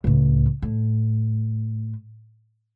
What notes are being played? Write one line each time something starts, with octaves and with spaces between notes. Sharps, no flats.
C#2 A2
A2